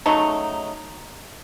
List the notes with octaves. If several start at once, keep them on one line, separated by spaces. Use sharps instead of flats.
C#3 F#3 A3 D#4